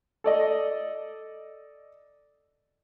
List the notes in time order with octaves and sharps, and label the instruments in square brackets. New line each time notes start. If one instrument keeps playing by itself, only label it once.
[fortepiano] A4 D5 D#5